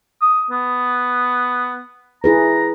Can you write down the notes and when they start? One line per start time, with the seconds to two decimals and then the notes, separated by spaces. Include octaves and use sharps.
0.21 D#6
0.51 B3
2.24 E4 G#4 B4 A#5